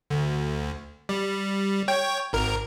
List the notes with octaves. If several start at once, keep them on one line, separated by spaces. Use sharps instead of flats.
D2
G3
C#5 G5
G#1 A#4